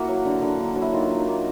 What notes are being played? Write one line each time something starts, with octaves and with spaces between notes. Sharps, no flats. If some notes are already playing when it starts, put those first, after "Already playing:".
Already playing: A#3 E4 F#4
F#3
D3
D3
A#3
F#3
E4
D#3 F4
D#3
D#4
A#3